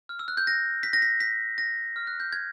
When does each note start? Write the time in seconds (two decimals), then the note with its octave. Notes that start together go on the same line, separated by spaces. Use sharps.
0.09 F6
0.19 E6
0.28 F#6
0.37 G6
0.47 A#6
0.83 B6
0.93 A#6
1.02 B6
1.20 B6
1.58 A#6
1.96 F6
2.07 F#6
2.20 G6
2.33 G#6